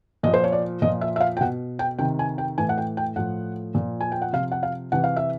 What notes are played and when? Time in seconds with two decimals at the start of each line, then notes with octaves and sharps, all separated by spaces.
0.23 A#2 F3 D#5
0.34 C5
0.44 C#5
0.52 D5
0.82 A#2 F3 D#5
1.01 E5
1.16 E5
1.20 F5
1.37 G5
1.41 B2 F#5
1.79 G5
1.99 C3 D#3 G5
2.19 G#5
2.38 G5
2.58 A2 E3 G#5
2.69 F#5
2.78 G5
2.97 G5
3.16 A2 F3 F#5
3.75 A#2 F3
4.01 G#5
4.12 G5
4.22 F#5
4.33 C3 F3 F5
4.52 F#5
4.63 F5
4.92 C3 E3 F#5
5.04 F5
5.17 E5